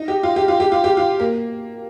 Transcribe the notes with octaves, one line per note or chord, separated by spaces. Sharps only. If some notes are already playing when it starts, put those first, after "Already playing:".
Already playing: D#4
G4
F4
G4
F4
G4
F4
G4
F4
A#3